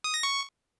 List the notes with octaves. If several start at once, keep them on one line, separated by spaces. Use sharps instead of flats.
D#6
A#6
C#6